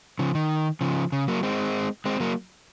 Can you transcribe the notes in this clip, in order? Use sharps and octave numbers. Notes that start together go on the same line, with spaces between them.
C#3 F3
D#3
C#3 F3
C#3
F#3 A#3
G#3 C4
G#3 C4
F#3 A#3